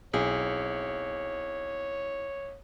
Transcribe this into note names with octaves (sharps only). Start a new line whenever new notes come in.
B1 C4 E4 G#4 C#5